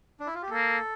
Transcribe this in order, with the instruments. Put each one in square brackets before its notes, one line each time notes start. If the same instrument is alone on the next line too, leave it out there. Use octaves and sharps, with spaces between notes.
[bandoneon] D4
E4
F4
G4
[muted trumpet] A#3 [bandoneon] A4